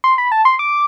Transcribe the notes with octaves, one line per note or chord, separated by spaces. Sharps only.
C6
B5
A5
C6
D6